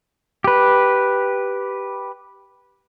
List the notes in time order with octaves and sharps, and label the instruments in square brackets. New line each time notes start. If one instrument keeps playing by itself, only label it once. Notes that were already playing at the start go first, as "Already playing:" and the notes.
[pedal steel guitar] G4 B4